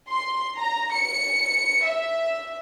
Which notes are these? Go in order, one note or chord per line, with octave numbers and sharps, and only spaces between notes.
C6
A#5
C#7
E5